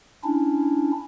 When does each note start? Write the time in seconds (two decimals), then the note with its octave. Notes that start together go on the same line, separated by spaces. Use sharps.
0.24 C#4 D4 E4